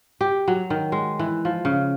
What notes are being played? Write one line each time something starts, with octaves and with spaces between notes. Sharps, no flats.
G4
F#3
D#3
G#3
E3
F3
C#3